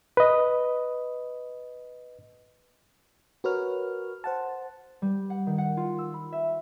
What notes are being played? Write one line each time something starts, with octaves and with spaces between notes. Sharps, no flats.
B4 D#5
F#4 A#4 B4 C#5 F6
C5 F#5 A5
G3
F#5
D#3
F#5
F4
E6
B5
E5